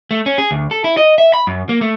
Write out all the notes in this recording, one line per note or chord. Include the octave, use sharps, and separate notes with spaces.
A3
C#4
G#4
D2
A4
E4
D#5
E5
B5
F#2
A#3
A3